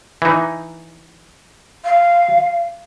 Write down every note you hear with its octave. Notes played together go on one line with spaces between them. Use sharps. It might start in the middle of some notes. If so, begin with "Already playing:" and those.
E3 D#4
F5